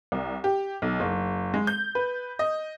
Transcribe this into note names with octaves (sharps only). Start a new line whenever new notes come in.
C2
G4
B1
F#1
G#3
G6
B4
D#5